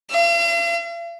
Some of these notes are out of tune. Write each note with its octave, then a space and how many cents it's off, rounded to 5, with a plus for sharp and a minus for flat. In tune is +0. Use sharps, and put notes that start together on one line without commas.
F5 -45